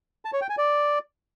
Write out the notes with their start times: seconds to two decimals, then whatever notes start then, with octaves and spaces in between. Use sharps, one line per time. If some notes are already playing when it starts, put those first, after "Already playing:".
0.25 A5
0.33 C#5
0.41 G5
0.50 G#5
0.58 D5